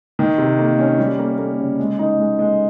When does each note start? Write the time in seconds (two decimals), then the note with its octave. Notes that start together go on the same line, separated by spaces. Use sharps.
0.19 D#3
0.38 C3
0.58 A#3
0.79 C#4
0.99 G3
1.19 A#3
1.38 A#3
1.59 C#3
1.79 G#3
1.99 D#4
2.19 G#3
2.39 G#3